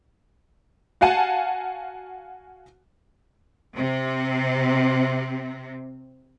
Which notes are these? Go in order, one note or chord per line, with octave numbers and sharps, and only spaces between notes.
F#4 F5 F#5 G#5 A5
C3 C4